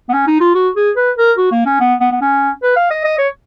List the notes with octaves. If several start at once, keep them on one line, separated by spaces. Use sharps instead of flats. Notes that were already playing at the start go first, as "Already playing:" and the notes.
B3
C#4
D#4
F4
F#4
G#4
B4
A#4
F#4
A#3
C#4
B3
B3
B3
C#4
B4
F5
D#5
D#5
C#5